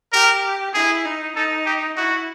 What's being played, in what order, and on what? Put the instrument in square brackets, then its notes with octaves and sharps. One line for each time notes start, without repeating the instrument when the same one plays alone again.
[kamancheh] G4 [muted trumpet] A#4
[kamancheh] E4 [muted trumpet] G#4
[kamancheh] D#4
[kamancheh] D#4 [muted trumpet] A4
[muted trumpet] G4
[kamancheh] E4 [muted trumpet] F#4